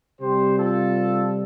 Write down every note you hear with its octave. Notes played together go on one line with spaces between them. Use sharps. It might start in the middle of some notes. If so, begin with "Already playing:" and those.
C3 G3 G4 C5
F4 A4